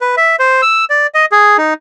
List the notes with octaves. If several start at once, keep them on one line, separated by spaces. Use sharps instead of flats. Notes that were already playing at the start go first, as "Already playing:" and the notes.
B4
E5
C5
E6
D5
D#5
G#4
D#4